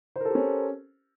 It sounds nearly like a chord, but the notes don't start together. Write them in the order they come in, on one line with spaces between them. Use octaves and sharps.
C5 A#4 A4 G4 C#4